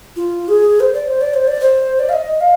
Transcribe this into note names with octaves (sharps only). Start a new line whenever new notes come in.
F4
G#4
C5
D5
C5
D5
C5
D5
C5
D5
F5
D#5
F5